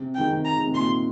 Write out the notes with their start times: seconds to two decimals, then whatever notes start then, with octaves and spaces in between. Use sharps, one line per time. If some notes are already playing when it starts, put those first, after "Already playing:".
Already playing: C3
0.15 D#3 G5
0.30 C3
0.45 A#5
0.57 D#3
0.66 C3
0.74 A#2 C6